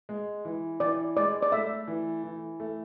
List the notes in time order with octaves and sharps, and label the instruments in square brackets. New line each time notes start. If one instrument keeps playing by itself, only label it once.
[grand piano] G#3
E3
[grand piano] E3 [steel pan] D5
[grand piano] G#3 [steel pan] D5
[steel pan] D5
[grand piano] A3 [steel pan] E5
[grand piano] E3
E3
A3